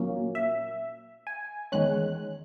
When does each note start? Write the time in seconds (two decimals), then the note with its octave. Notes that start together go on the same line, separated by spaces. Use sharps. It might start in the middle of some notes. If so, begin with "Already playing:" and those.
Already playing: A#2 F#3 A#3 C#4
0.35 E5
1.27 G#5
1.72 E2 D#3 G#3 C#4 F#6